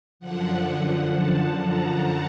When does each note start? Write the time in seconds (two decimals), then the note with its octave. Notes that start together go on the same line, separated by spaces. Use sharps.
0.20 F#2 D3 F3 F#5
0.67 F#5
1.13 A5
1.60 A#5